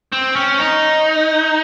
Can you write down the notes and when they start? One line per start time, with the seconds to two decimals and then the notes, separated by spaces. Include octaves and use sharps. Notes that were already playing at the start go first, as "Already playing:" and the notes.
0.12 C4
0.36 C#4
0.58 D#4